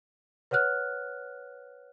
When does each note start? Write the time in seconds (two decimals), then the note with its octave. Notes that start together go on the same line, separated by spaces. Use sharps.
0.51 B4 C#5 F#5 F6 F#6